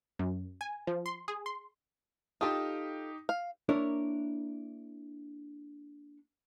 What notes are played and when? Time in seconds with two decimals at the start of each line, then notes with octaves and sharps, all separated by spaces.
0.19 F#2
0.61 G#5
0.87 F3
1.06 C6
1.28 G#4
1.46 C6
2.41 D#4 F4 G4 A4 D#6
3.29 F5
3.69 A#3 D4 E4 A#4 C#5